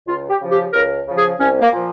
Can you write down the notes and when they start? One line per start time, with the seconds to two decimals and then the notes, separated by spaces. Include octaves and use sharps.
0.07 C#2 F4
0.30 G4
0.41 C#3 F3
0.51 G4
0.73 C#2 A#4
1.06 C#3 F3
1.17 G#4
1.39 C2 C#4
1.61 A#3
1.72 A#2 F3